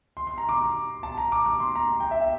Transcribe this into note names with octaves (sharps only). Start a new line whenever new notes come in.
C6
C6
A#5
D6
A5
A#5
D6
D6
C6
A#5
G5
E5
E5